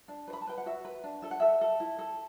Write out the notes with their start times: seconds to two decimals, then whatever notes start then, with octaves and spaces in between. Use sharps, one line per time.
0.08 D4
0.28 B4
0.33 B5
0.41 A5
0.47 B4 G5
0.58 F#5
0.66 F#4 E5
0.85 B4
1.04 D4
1.22 A4 E5
1.31 F#5
1.40 A4 E5
1.61 A4
1.80 E4
1.99 A4